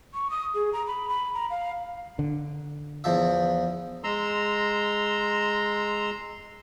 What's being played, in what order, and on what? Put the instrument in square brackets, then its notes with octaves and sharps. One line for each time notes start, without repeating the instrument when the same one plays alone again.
[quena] C#6
D#6
G#4
A#5
B5
B5
A#5
F5
[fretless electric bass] D3
[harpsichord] E2 F3 E5
[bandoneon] G#3 A#5 C6 E6